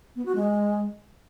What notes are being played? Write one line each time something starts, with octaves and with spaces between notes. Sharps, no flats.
B3
F#4
G#3